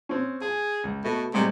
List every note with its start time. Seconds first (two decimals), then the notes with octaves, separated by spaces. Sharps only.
0.09 C4 C#4
0.42 G#4 G#5
0.84 C#2
1.04 B2 A3
1.34 A2 C3 G3 G#3